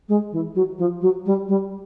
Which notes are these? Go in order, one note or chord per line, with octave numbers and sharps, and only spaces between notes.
G#3
E3
F#3
F3
F#3
G3
G3